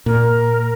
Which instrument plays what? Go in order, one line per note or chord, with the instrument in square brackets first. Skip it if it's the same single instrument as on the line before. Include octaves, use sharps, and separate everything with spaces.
[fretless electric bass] A#2 [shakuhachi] A#4